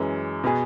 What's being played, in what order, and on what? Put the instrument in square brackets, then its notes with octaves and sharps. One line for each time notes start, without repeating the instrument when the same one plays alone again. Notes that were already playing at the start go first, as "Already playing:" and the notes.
Already playing: [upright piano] F#2 E3 G#3
B2 B3 G#4